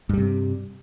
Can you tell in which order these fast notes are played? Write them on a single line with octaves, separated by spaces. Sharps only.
G2 G3 C3